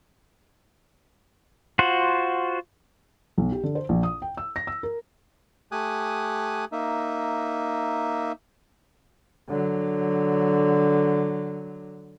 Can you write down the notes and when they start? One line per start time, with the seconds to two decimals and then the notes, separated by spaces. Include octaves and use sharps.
1.79 F4 F#4 C5 F#5
3.38 B1
3.52 G4
3.63 D3
3.75 C5
3.89 A#1
4.03 D#6
4.22 G5
4.37 E6
4.56 A#6
4.67 E6
4.83 A#4
5.72 A3 G4 G#5 D#6 F#6
6.72 A#3 D#4 E5
9.49 D3 F#3